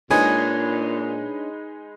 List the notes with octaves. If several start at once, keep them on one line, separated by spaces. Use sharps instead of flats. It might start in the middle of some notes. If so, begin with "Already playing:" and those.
A#2 G#3 D4 D#4 G#4 B4 C#5 D#5